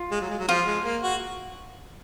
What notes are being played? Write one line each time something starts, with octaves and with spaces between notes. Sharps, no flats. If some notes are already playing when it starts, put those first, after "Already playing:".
Already playing: F4
G#3
F#3
G#3
F#3
F3 F4
G#3
A#3
F#4